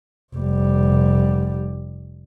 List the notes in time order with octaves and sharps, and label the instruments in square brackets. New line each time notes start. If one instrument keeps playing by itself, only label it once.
[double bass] F1 G3